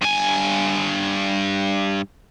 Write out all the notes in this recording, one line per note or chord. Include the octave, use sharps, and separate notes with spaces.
G2 G#5